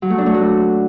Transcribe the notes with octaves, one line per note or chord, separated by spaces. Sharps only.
F#3
A3
D4
A3
F#4